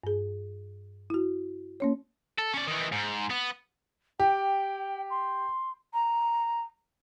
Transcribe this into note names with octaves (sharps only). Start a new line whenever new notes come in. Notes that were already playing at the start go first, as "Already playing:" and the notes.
G2 G#4
E4 F#4
A#3 C#4 C#5
A4
C#4 D5
D#3 E3
G#2
B3
G4 G5
C6
A#5